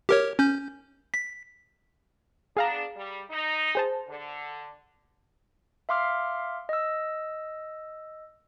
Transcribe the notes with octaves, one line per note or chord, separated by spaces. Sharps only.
G4 A#4 C#5
C#4 G6
B6
B3 D4 G#4 F5 A#5
G3
D#4
G#4 C5 A5
D3
E5 F5 C6 D6 F6
D#5 E6